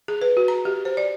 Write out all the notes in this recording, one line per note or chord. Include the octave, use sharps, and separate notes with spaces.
G#4
B4
F#4
A#5
G4
C5
D5